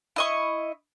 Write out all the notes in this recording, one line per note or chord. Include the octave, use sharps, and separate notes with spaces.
E4 D#5 C#6